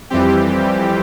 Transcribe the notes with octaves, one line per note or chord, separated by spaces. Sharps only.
F2 E3 G3 C4 G4